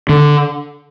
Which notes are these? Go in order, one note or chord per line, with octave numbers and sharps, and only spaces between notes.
D3